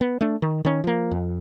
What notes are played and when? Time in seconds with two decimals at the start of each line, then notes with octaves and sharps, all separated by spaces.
0.01 B3
0.21 A3 D4
0.42 D#3
0.65 D#3 C#4
0.84 F3 A#3
1.11 F2